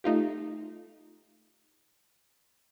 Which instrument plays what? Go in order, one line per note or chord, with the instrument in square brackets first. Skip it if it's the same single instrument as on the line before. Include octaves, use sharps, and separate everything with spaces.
[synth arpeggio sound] A3 D#4 F4 G4